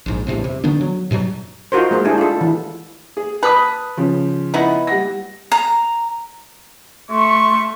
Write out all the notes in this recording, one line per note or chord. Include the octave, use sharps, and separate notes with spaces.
A#1 G#2
A1 E2 G2 C3
C3
D3 D#3 B3 D4
F#3
G#2 B2 F3 F#3
D#4 F4 F#4 A#4 C5
G#3 A#3 C5
G#3 A3 D4 E4 G4 G#4
F4 A4
E3
G#4
B4 A5 B5 D#6
C#3 F3
B3 D#4 E4
G3 F#5 A#6
A#5
A3 C6 C#6